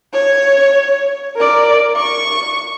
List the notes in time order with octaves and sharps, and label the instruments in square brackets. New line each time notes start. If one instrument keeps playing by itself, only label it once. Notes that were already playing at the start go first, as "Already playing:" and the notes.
[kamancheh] C#5
A#4 D5
C#6